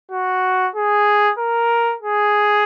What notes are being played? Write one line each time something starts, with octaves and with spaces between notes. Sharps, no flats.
F#4
G#4
A#4
G#4